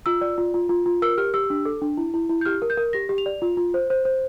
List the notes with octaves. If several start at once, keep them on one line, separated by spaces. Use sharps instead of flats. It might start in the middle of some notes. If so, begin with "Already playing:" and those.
F4 E6
D5
F4
F4
F4
F4
A#4 E6
G4 F6
G4 E6
D4
A4
D4
E4
E4
E4
G6
G4 F6
A#4
G6
A#4
G4 A#6
G4
F7
D5
F4
F4
C5
C5
C5